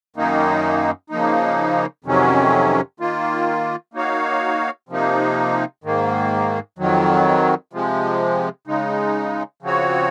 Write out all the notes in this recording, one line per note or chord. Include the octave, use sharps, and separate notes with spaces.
F#2 D#3 A#3 D#4
C#3 F3 A#3 D#4
F2 C3 D#3 F#3 C#4
D#3 A#3 F4
A#3 D#4 F#4 C#5 F5
C3 F3 A#3 D#4
G#2 D#3 A#3
F2 D#3 F#3
C3 F3 G#3
C#3 G#3 D#4
C#3 F3 C4 F#4 C#5